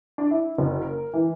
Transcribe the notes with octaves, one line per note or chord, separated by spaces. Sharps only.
D4
E4
F#1
A#4
E3